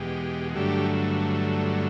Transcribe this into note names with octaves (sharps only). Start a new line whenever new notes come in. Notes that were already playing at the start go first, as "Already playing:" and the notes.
Already playing: E2 B2 G#3 G4
G2 D3 F#3 A3 G4